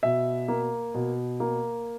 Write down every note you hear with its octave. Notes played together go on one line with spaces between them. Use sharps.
B2 E5
A#3
B2
A#3